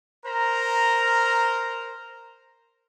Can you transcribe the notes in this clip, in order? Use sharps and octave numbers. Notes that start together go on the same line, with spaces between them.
A#4 C5 A#5